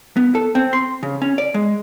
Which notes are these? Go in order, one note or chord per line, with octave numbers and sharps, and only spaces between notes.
B3
A4
C4
C6
C#3
C#4
D5
G#3